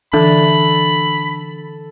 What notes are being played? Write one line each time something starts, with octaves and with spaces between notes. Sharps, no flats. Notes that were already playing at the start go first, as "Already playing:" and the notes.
D3 E3 D4 A4 B5